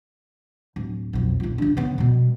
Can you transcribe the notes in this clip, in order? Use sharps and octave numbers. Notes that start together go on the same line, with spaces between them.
D1
B1 F2
D#1 F4
C#3 D4
C#3 B3
B2 G3